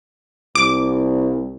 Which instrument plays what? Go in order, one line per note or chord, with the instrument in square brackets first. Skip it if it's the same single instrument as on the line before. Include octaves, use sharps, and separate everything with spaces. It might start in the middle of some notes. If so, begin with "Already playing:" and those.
[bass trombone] C2 [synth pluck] D6